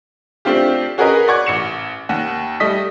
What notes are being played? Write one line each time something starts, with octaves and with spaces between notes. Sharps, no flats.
A3 C4 D4 F4 G4
C#4 F#4 G#4 A#4 B4 D#5
D5 F#5 C#6 D6 G#6
A1 C#7 E7
D#2 F#5
G3 A3 D#5 D#6 B6